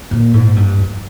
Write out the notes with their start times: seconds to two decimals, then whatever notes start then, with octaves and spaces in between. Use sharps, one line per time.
0.11 A#2
0.33 G#2
0.56 G2
0.78 F2